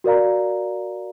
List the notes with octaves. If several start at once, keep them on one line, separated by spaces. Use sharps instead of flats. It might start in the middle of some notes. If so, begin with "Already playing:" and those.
F#4 A#4 D5 F5 A#5